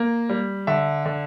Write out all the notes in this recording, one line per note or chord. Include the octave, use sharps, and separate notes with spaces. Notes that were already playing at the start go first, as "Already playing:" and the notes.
Already playing: A#3
G3
D3 E5
D3